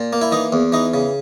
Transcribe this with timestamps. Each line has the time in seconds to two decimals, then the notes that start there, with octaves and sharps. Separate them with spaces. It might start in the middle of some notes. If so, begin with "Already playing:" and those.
Already playing: A#2
0.13 A#3
0.21 E4
0.32 E3 D#4
0.53 E2
0.72 E3 D#4
0.94 C#3